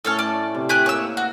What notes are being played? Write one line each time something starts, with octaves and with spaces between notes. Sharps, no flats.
A2 C#4 A4 C#5 F6
D5 A5
C3
G4 G#4 F#6
A#3 C#5 E6
F#4